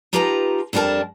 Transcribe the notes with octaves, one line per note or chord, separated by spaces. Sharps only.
D#4 F4 G4 B4 A5 A#5
F2 G3 D4 F#4 A#4 A5